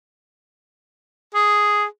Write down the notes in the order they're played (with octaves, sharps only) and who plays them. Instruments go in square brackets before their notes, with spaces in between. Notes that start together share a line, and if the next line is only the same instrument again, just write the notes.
[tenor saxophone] G#4